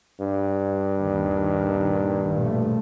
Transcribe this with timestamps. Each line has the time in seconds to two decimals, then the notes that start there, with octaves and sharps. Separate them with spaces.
0.20 G2
1.00 D#2 A#2 D#3
2.31 A#1 B2 A3